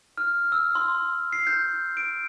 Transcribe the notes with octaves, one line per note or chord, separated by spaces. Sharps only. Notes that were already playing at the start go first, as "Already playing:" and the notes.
F6
E6
C6
C7
G6
D7